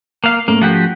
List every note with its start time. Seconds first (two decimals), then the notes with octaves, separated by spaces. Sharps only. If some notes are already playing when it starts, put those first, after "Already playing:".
0.24 A#3 F5
0.48 G#2 A3 A#3 C#4
0.62 F3 F#4 G4